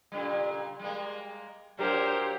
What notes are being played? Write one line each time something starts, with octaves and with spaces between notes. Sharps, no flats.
A#2 C#3 G3
G3 G#3 A#3
A#2 F#3 D4 G4 A#4 C5